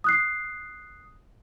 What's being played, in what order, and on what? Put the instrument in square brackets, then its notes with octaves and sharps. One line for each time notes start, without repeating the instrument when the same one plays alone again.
[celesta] D#6 F#6 C7